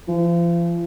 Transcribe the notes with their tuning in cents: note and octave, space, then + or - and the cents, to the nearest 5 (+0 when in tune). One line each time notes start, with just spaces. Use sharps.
F3 -40